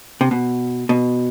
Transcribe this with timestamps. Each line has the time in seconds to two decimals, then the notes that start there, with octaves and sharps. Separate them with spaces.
0.21 C3
0.31 B2
0.89 B2